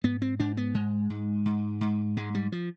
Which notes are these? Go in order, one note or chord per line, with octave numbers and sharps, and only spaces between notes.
G#2 B3
C4
G#2 D4
B3
G#2 G#3
G#2
G#2
G#2
G#2 G#3
G3
F3